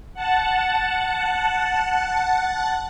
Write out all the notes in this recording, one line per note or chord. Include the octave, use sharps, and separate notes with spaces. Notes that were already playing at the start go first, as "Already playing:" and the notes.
F#5 A5